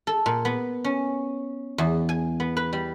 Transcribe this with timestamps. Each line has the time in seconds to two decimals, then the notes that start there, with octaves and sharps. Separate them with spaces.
0.07 A4
0.26 A#2
0.45 B3
0.85 C#4
1.78 E2
2.09 G#5
2.40 B3
2.57 B4
2.73 G3